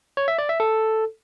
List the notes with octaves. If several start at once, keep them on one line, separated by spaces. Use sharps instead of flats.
C#5
E5
D5
E5
A4